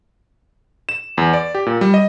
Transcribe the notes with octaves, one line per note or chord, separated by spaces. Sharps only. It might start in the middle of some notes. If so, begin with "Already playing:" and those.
E7
E2
D5
G4
A#2
G3
D#5